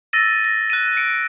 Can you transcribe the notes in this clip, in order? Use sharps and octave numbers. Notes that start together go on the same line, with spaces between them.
E6 A6 A#6 D#7
A#6
F#6 D#7
C#7 D7